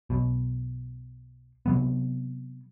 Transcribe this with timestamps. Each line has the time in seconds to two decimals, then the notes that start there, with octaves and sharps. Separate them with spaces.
0.10 B1 B2
1.66 C3 F#3 B3